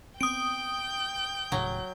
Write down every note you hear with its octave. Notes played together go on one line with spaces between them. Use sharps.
B3 C4 G5 D#6 G6 D7
D#1 A2 C#3 F#3